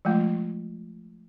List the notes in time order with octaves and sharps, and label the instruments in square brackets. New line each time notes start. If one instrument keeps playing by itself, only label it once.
[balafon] F3 G#3 A3 F4